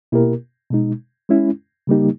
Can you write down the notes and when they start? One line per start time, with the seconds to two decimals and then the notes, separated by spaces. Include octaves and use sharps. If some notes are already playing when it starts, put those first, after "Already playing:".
0.12 B2 A#3 E4 G4 A#4
0.71 B2 G#3 D#4
1.29 G#3 C#4 E4
1.87 C#3 G3 A#3 D#4 G4